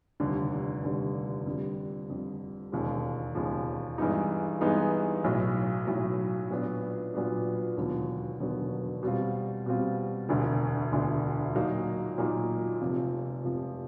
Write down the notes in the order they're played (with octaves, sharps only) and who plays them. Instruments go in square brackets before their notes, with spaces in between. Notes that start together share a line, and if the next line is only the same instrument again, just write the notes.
[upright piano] F1 D#2 D3 G3
F1 D#2 D3 G3
F2 D3 G3
F2 D3 G3
E1 D#2 C#3 F3 G#3
E1 D#2 C#3 F3 G#3
G2 E3 G#3 B3 D#4
G2 E3 G#3 B3 D#4
B1 A2 F#3
B1 A2 F#3
A#2 F#3 B3 D4
A#2 F#3 B3 D4
E1 D#2 D3 F#3 B3
E1 D#2 D3 F#3 B3
B2 G3 C4 F4
B2 G3 C4 F4
E1 D2 D3
E1 D2 D3
A#2 F#3 A#3 D#4
A#2 F#3 A#3 D#4
F1 F2 C3 F3
F1 F2 C3 F3